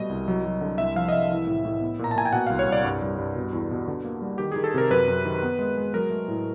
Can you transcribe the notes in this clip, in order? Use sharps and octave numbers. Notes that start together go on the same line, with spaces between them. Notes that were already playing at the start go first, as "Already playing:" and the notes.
Already playing: B2 G3 A3 D#5
C2
F#3
F#3
D3
C2 E5
F3 F5
D#5
C2 E5
E3
A2
A2
B3
A#2 A#5
A5
A#2 G#5
G5
B2 F#5
C2 F5
C#5
C2 D5
G2
G2
G2
B2
E2
B2
D3
A#3
G3
D#3 G4
D#3 G#4
A4
C3 A#4
F#2 B4
F#2
D#3
B3
G#3
G#3
F#3 A#4
A3
A2